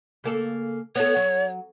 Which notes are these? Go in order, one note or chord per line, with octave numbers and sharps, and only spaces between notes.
C#3 A#3 A4
B3 A4 C#5
F#3